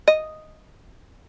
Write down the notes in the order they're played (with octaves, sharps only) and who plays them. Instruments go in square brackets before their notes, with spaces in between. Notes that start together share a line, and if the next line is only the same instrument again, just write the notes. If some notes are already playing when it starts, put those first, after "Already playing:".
[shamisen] D#5